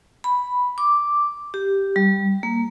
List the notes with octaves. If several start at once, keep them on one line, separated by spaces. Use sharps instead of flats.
B5
D6
G4
G3
A#3